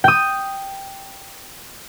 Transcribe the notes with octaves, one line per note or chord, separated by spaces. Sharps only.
G5 D#6